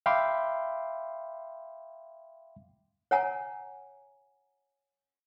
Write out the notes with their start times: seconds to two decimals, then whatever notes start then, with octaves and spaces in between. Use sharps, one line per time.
0.06 E5 F5 G5 B5 C6 D6
3.11 C#5 F#5 G#5 A#5